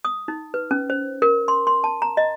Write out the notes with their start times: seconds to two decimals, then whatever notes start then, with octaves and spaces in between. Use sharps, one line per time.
0.05 D#6
0.28 D#4
0.54 B4
0.71 C#4
0.90 C5
1.22 A#4
1.48 C6
1.67 C6
1.84 A5
2.02 A#5
2.17 D#5